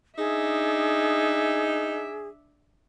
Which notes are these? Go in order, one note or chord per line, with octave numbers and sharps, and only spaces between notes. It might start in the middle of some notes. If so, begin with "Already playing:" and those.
D4 D#4 G#4 E5